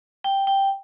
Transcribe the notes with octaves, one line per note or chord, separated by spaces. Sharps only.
G5
G5